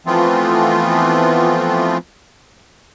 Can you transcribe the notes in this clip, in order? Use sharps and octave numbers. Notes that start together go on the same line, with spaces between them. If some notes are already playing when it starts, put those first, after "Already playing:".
E3 F3 A3 B3 C4 F4